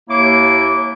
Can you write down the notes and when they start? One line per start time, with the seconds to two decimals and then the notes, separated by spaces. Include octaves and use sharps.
0.10 D#2 A#3 E4 C#5 D6